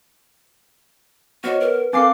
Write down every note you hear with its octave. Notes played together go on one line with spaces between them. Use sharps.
B3 F#4 C5 C#5 D#5
A#4 B4
C4 A4 A#4 F5 G#5 D6 C7